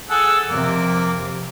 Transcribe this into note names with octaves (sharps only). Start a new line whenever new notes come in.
G#4 A4 F#5
F2 C3 A#3